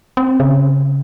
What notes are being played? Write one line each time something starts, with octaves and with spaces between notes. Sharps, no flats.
C4
C#3